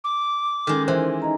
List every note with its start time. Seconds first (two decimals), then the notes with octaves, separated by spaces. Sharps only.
0.04 D6
0.67 D#3 G#3 C#4 A4
0.88 E3 C5
1.22 D#4 D#5 A#5